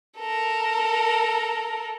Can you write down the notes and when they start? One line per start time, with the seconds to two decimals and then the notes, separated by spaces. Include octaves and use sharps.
0.19 A4 A#4